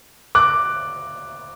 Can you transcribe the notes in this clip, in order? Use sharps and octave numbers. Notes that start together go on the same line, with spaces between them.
D6 F#6